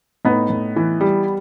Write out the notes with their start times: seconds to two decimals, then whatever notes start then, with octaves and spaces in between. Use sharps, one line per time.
0.25 A2 B3 D#4
0.50 A2
0.76 E3
1.01 G3